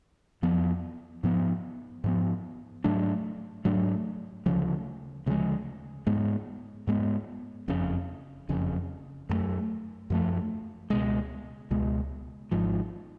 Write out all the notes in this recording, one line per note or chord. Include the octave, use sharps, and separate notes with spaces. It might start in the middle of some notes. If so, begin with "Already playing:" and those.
F2 F3 B3
G#2 F3 B3
G#2 F3 B3
G#2 F#3 A3 D4
G#2 F#3 A3 D4
D2 C#3 F3 G#3
D2 C#3 F3 G#3
G#2 G#3 B3
G#2 G#3 B3
F#1 F2 C#3
F#1 F2 C#3
F#2 F3 A3
F#2 F3 A3
C#2 B2 G#3
C#2 B2 G#3
G#1 G#2 F3